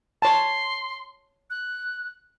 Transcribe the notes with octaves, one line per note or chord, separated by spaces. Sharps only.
C#5 A5 C6
F#6